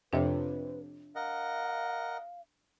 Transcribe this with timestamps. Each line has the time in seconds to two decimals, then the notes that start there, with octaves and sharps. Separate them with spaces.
0.13 F2 C3 D4 B4 C#5
1.16 A#4 D#5 F5 F#5